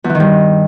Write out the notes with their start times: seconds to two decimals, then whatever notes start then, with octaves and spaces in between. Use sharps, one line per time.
0.04 E2
0.10 E3
0.15 D#3
0.20 G2